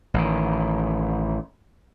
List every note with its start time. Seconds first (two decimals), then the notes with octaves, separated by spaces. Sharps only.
0.14 A1 D#3